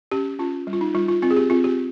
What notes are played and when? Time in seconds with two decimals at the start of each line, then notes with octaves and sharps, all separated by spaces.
0.12 C#4 G4
0.39 C#4 F4
0.67 G3
0.73 F4
0.81 D#4
0.95 G3 F4
1.08 F4
1.22 C4 F4
1.31 G#4
1.36 G4
1.50 C4 F4
1.64 G4